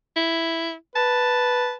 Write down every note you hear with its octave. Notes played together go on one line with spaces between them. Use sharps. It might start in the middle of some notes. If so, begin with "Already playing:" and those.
E4
B4 A5